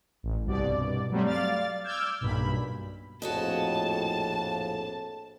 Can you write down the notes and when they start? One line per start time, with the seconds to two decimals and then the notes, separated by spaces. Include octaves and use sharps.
0.23 A1
0.45 C2 G2 B2 D5
1.11 F#3 G3 A3 C4
1.26 D5 F5 F6 A6
1.84 D6 E6 F6 G6 G#6
2.21 B1 G2 A#2 B5
3.22 A#1 F2 A2 F#4 G#4 D#5 A5